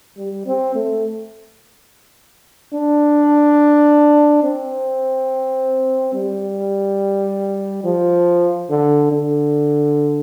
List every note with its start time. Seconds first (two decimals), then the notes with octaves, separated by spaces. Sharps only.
0.17 G3
0.46 C4
0.75 A3
2.74 D4
4.43 C4
6.14 G3
7.84 F3
8.69 D3
9.12 D3